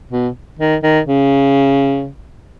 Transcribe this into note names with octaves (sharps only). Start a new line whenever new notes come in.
B2
D#3
D#3
C#3